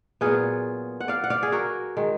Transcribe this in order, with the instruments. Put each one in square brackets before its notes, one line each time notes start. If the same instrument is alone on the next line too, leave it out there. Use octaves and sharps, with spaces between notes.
[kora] A#2 F#3 B3 F4 G#4
F#5
D5 F5
F#5
D5 F5
G#4
F#4 A#4
D#3 G#3